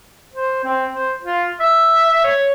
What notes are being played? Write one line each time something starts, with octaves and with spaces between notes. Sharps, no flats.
C5
C4
C5
F4
E5
C#5